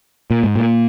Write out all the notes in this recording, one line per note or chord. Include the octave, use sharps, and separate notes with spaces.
A#2
G#2
A#2